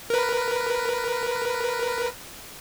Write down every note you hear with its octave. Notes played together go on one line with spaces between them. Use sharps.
A#4 B4